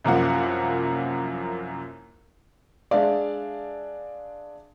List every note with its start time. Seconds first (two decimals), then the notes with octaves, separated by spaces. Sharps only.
0.04 C2 F#2 F3 A#3 F#5
2.91 G#3 D4 D5 E5 F5